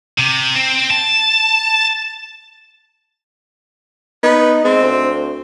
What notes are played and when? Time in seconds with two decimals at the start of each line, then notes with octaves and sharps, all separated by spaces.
0.19 C3
0.55 C4
0.91 A5
4.23 B3 D#4
4.64 G#3 C4
4.82 D2